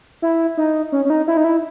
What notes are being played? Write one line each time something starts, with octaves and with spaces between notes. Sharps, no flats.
E4
D#4
C#4
C#4
D#4
E4
D#4
E4